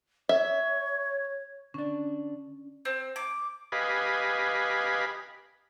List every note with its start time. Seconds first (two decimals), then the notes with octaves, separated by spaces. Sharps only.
0.29 C#5 E5
1.74 D3 C#4 D4
2.85 C4
3.16 D6
3.72 G4 B4 D#5 F5 G#5 B5